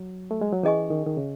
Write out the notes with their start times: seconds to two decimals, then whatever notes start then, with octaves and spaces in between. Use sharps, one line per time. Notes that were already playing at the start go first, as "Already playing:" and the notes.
Already playing: F#3
0.31 A3
0.41 G#3
0.52 F#3
0.63 E3 C#4 G#4 D#5 G#5 C#6
0.90 D#3
1.06 D#3
1.17 C#3